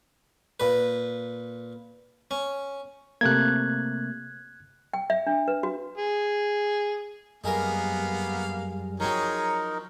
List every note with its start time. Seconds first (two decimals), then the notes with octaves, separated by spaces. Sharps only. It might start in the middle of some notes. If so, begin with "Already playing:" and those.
0.60 A#2 B4
2.31 C#4
3.21 C3 A3 A#3 F#6 G#6
4.94 G5
5.10 E5
5.27 D4
5.48 B4
5.63 F#4
5.98 G#4
7.44 F#2 G3 A#3 B3 D#4 G#4 A#4 F5
9.00 F3 F#3 C4 D#4 G#4 A#4 C#5